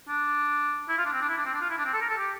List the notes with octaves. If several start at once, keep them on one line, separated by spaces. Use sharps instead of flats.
D4
E4
F4
D4
C4
D4
E4
D4
C4
D4
F4
E4
D4
C4
A4
A#4
A4
G4